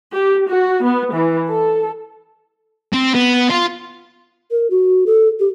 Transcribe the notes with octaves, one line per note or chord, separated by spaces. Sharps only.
G4
F#4
B3
E3
A4
C4
B3
F4
A#4
F#4
A4
G4